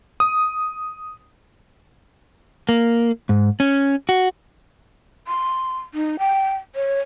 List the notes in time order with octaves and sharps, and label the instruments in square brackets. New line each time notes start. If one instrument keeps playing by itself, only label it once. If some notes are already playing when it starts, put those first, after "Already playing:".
[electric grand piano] D#6
[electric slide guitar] A#3
G#2
C#4
F#4
[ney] C6
D#4
G5
C#5